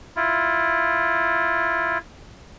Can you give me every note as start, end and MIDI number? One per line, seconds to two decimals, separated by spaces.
0.16 1.98 64
0.16 1.98 65